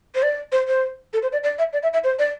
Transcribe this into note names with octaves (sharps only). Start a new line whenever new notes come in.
C5
D5
C5
C5
A4
C5
D5
D5
E5
D5
E5
E5
C5
D5